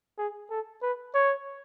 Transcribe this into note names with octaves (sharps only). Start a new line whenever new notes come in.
G#4
A4
B4
C#5